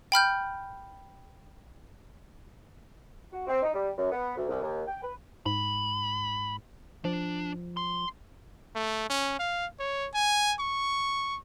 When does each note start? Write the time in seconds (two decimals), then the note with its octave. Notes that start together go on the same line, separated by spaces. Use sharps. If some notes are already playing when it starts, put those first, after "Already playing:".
0.12 G5 B5 F6 G6
3.33 F#4
3.47 C4
3.63 D#4
3.74 G3
3.98 F#2
4.11 B3
4.37 D2
4.49 C2
4.62 D#2
4.87 G5
5.02 B4
5.46 G#2 B5
7.05 F3 D4
7.77 C6
8.76 A3
9.10 C#4
9.39 F5
9.79 C#5
10.14 G#5
10.60 C#6